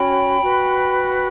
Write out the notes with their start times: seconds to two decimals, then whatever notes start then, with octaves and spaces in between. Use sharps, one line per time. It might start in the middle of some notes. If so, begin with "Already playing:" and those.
Already playing: C#4 F#4 C#5 G5 B5
0.40 F#4 B4